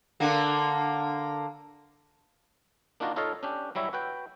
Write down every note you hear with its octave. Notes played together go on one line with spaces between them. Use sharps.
D3 A#3
A#3 D4 D#4 F4 F#4 A#4
D#4 F4 A4 C#5 D#5 F5
C#4 D4 G4
F#3 G3 E4 C#5 E5
F#4 B4 G5